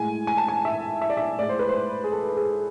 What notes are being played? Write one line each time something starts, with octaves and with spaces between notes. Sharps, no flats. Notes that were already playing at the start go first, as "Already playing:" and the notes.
Already playing: A2 G#3 G#5
G#5
A5
G#5
E5
E5
D5
E5
A2 G#3 D5
C5
B4
C5
G#4
A4
G#4